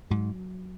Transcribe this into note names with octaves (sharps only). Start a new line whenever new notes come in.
G#2 F#3